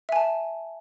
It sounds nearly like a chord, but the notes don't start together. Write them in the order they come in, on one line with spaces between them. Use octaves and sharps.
E5 G#5 A5